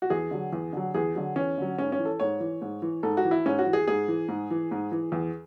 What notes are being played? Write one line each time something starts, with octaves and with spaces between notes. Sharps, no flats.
F#4
E2 G#4
D3 F#3
E2
D3 F#3
E2 G#4
D3 F#3
E2 C#4
D3 F#3
G#2 C#4
C#4
E3
A4
G#2 C#5
E3
G#2
E3
G#2 A4
F#4
E3
E4
G#2 C#4
F#4
E3
G#4
G#2 G#4
E3
G#2
E3
G#2
E3
E2